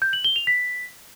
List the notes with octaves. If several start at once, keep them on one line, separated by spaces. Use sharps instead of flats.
G6
F#7
G7
F7
B6